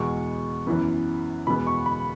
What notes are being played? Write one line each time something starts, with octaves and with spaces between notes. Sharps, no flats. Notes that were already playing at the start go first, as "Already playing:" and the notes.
Already playing: E2 B2 G#3 B3 C#6
F#2 E3 B3
E2 B2 G#3 B3 B5
C#6
B5